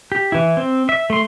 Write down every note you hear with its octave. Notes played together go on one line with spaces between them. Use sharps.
G4
E3 E4
C4
E5
A3 C6